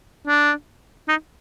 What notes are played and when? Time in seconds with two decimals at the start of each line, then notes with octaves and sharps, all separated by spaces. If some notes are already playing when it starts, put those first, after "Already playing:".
0.27 D4
1.08 D#4